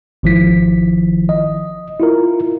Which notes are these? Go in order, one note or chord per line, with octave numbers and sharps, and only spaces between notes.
G#1 D#3 F3 E4 B6
D#5
E4 F4 A#4